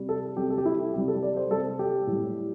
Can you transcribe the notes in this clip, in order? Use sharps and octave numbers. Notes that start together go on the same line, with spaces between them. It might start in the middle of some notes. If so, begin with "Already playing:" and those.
Already playing: C3 G3
A4
C3 G3 G4
A4
G4
E4
C3 G3 G4
A4
D5
C5
C3 G3 A4
G4
A2 G3